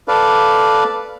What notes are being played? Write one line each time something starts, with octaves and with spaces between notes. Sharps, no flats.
A4 B4 D5 F5